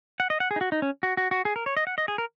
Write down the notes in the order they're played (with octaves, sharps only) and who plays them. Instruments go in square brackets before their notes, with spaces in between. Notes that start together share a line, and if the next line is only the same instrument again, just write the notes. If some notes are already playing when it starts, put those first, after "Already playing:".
[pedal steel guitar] F#5
D#5
F#5
G#4
D#4
F#4
D#4
C#4
F#4
F#4
F#4
G#4
A#4
C#5
D#5
F#5
D#5
G#4
A#4